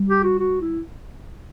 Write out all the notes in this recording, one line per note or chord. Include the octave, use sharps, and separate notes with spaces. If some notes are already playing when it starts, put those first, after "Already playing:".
Already playing: G3
G4
F#4
F#4
E4